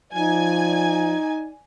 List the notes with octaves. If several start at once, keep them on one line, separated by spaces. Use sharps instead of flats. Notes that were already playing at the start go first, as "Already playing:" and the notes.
F3 D#4 D5 G#5 G#6